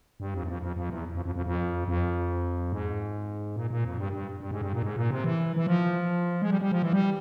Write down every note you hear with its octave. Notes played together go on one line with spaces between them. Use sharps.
G2
F2
E2
F2
F2
F2
E2
F2
F2
F2
F2
F2
G#2
A#2
A#2
F2
G2
G2
G2
G#2
G2
A#2
G#2
A#2
C3
E3
E3
F3
G#3
G3
G3
F3
E3
G3